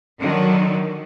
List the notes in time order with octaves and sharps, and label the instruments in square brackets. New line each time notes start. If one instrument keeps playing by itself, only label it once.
[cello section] D3 D#3 F#3